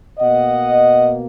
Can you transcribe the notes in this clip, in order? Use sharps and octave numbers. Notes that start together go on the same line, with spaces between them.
B2 A#3 D#5 F#5